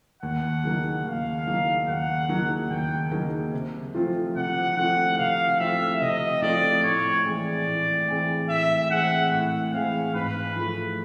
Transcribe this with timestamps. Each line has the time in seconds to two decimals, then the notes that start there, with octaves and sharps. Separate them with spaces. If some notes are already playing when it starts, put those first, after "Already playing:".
0.22 D#2 F#5
0.64 C#3 F#3 A#3 D#4
1.05 D#2 F5
1.47 C#3 F#3 A#3 D#4
1.87 D#2 F#5
2.29 C#3 F#3 A#3 D#4
2.71 D#2 G5
3.11 C#3 F#3 A#3 D#4
3.53 C3
3.95 F3 A3 C4 F4
4.36 C3 F#5
4.77 F3 A3 C4 F4 F#5
5.18 C3 F5
5.60 F3 A3 C4 F4 E5
6.02 C3 D#5
6.42 F3 A3 C4 F4 D5
6.83 A2 C#5
7.26 E3 G#3 C4 D5
7.66 A2
8.08 E3 G#3 C4
8.49 A2 E5
8.90 E3 G#3 C4 F#5
9.31 A2 F#5
9.73 E3 G#3 C4 F5
10.14 G#2 B4
10.56 F3 A3